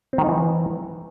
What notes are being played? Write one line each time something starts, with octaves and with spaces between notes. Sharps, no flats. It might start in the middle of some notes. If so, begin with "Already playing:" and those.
C4
D#3
D#4
E3